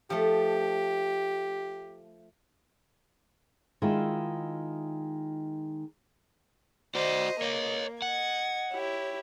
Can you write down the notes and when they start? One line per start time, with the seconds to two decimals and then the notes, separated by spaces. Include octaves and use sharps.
0.10 F3 A3 G4
3.82 D#3 G#3 E4 F4
6.95 F#4 C5 D5 D#5
7.42 A#3 C#5 D#5
8.02 D#5 F#5 G#6
8.72 E4 G4 C#5